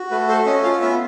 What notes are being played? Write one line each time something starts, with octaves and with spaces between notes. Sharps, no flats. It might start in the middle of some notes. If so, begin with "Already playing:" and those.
Already playing: F#4
A3 B4
A4 C5
C#4 D#5
F4 F5
B3 E5